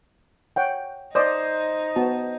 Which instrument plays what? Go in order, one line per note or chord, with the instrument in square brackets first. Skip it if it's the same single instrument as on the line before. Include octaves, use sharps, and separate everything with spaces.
[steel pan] C#5 F#5 G5
[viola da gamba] D#4 [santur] C5 D#5 [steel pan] D5
[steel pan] B3 F#4 A5